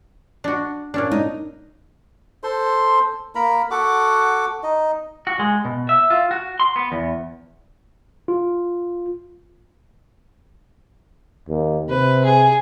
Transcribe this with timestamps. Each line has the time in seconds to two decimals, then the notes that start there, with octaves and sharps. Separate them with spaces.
0.44 D4 F#4
0.94 A#2 C#4 D4
1.11 D#4
2.43 A4 C5 C6
3.35 A#3 A#4 A#5 B5
3.71 F#4 A4 F#5 D6
4.63 D#4 D#5
5.27 F#4
5.39 G#3
5.65 B2
5.89 E5
6.10 F4
6.31 F#4
6.60 C6
6.76 B3
6.92 E2
8.28 F4
11.49 D#2
11.89 C3 B4
12.25 G#4